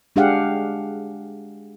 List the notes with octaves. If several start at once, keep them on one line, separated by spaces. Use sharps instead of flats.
G#3 D4 G4 G#4 F5 F#5